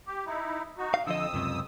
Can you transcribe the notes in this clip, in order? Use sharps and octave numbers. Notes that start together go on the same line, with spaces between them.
G4
D#4 E4
D#4 F#4
F5
F2 D3 F3 D#5 D#6 E6
C#2 F#2 C3